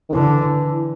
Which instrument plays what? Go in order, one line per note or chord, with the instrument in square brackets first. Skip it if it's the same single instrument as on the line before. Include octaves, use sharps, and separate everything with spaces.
[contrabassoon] D#3
[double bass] D3 [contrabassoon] E3